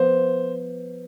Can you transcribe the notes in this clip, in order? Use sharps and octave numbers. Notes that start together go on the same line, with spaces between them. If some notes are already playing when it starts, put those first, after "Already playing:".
Already playing: F3 B3 C5